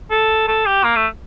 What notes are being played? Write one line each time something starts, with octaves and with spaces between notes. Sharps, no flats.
A4
A4
G4
A#3
A3